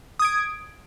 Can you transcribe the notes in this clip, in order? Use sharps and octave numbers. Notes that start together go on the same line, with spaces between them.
D#6 G#6 D7